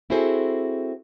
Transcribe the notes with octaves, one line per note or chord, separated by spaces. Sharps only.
C4 E4 F#4 G#4 A4 C5